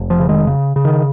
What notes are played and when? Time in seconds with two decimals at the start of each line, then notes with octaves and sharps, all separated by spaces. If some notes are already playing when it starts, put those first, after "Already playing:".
Already playing: F1
0.10 F3
0.20 C#3
0.29 D#3 G#3
0.47 C#3
0.76 C#3
0.85 D#3